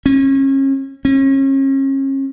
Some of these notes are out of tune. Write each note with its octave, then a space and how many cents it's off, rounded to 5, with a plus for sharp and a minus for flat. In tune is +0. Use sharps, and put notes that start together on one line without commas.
C#4 -35
C#4 -35